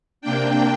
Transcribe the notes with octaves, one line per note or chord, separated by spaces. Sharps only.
C3 A#3 D4 G5